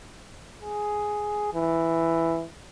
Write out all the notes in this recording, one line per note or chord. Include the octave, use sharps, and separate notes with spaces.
G#4
E3